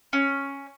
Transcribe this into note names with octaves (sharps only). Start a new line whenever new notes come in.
C#4